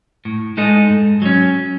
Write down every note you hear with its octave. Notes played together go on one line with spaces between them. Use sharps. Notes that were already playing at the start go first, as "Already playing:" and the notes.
A2
G#3 D#4 A4 D#5
G#2
F#3 C#4